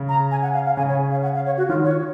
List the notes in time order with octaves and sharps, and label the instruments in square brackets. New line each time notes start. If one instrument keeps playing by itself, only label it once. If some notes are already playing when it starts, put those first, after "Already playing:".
Already playing: [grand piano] C#3
[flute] A#5
G#5
F#5
F5
F5
[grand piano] C#3 [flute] G#5
[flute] C#5
F5
F#5
F5
C#5
F#4
[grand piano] D#3 [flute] F4
[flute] C#5